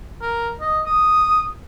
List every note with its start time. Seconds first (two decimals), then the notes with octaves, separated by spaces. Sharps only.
0.21 A#4
0.61 D#5
0.86 D#6